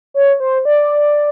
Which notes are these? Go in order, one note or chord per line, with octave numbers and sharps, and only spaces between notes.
C#5
C5
D5